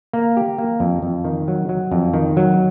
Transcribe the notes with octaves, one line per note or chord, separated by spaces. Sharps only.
A#3
G4
A#3
F2
F2
D#3
F#3
F#3
F2
D#3
F#3